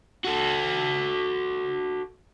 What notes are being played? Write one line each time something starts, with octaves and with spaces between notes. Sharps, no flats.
F#4 A4